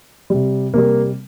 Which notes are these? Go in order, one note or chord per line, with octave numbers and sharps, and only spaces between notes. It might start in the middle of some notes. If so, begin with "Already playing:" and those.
C3 G3
C3 G3 A#3